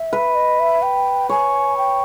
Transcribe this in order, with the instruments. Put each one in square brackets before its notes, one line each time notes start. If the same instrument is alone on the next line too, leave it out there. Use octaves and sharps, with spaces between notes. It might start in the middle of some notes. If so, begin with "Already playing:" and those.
Already playing: [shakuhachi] E5
[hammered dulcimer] B4
[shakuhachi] D#5
E5
G5
[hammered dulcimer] C#5 [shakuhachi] G#5
[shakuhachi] G5